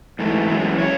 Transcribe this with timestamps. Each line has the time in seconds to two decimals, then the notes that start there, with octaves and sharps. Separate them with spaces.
0.19 G#2 E3 A3
0.49 F#2 E3 G#3
0.78 C#3 E3 G#3 C#5